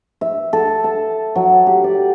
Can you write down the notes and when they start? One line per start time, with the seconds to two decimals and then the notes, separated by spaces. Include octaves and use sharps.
0.21 E5
0.53 A4
0.84 A5
1.35 F#3
1.67 G4
1.84 D5